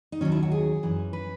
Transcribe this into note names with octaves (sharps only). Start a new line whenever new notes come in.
D#4
D#2 D#3 F#3 C#4
E4
F#4
G#4
F#2 E3
B4